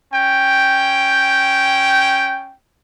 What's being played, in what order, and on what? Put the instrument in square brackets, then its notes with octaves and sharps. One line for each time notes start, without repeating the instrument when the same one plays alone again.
[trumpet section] C#4 G5